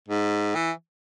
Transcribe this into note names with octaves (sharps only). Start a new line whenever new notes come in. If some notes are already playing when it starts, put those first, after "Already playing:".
G#2
E3